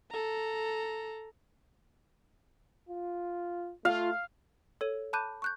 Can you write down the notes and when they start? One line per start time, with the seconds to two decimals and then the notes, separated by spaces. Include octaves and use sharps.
0.11 A4 A#5
2.89 F4
3.85 A3 F4 F5
4.81 A4 C#5 D#7
5.13 A5 B5 D6 F#6 G6 D#7
5.42 C#6 F#6 G6